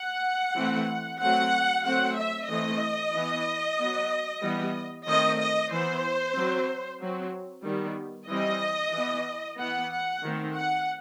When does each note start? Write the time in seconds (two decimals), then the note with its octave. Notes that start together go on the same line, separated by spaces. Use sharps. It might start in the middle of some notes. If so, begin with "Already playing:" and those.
Already playing: F#5
0.56 E3 A3 C4
1.21 F#3 A3 C4 F#5
1.85 F#3 A3 C4 F#5
2.17 E5
2.50 E3 A3 C4 D#5
3.15 E3 B3
3.79 F#3 B3
4.44 E3 G3 B3
5.07 D#3 A3 C4 D#5
5.39 D#5
5.72 E3 B3 C5
6.37 F#3 C4
7.01 F#3 C4
7.65 D#3 G3 B3
8.30 E3 G3 C4 D#5
8.95 E3 B3
9.59 E3 B3 F#5
9.92 F#5
10.24 D#3 A3 C4
10.56 F#5